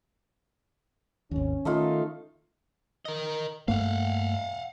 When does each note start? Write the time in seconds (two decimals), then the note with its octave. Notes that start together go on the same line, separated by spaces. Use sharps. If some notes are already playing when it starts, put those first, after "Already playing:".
1.31 G#1 D#2 C#4
1.65 D#3 A3 D#4 F4
3.05 A#4 D#5
3.68 G2 A3 A#3 F5 F#5